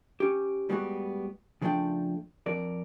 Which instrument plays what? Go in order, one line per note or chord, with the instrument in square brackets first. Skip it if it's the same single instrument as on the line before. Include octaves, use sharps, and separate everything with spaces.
[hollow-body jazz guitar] C#4 G4
A2 G3 G#3 B3 D#4 F#4
C#3 F3 A3 D4 A4 G5
F2 A#4 D5